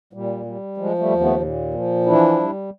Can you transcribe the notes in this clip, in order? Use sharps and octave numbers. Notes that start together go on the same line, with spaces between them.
A#2 G3
G3
F3 G#3
G3 A3
D#2
A3 B3
A#2
F3
E3 D4 E4
G3